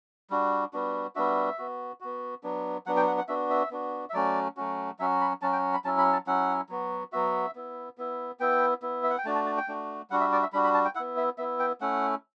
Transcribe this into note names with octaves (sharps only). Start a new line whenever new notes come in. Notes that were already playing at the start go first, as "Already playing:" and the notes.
G3 D4 F#4
G3 B3 D4 F#4
G3 B3 D4 F#4 E5
B3 F#4
B3 F#4
F#3 B3 D4
F#3 B3 D4 F#5
G5
F#5
F#5
B3 D4 F#4 E5
E5
B3 D4 F#4
E5
F#3 A3 C#4 F#4 D5
F#3 A3 C#4 F#4
F#3 C#4 F#4 E5
B5
F#3 C#4 F#4 A5
G5
B5
F#3 C#4 E4 A5
B5
A5
F#3 C#4 E4 F#5
F#3 B3 F#4
F#3 B3 F#4 E5
B3 E4
B3 E4
B3 E4 G5
B3 E4
E5
F#5
G5
A3 D4 F#4 A5
A5
A5
G5
A3 D4 F#4
G3 D4 F#4 F#5
E5
D5
E5
G3 D4 F#4 B5
B5
A5
G5
B3 E4 F#5
E5
B3 E4 E5
G5
A3 C#4 E4 F#5